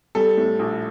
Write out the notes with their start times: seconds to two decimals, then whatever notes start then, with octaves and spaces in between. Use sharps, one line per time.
0.15 G3 A4
0.37 A2
0.59 A#1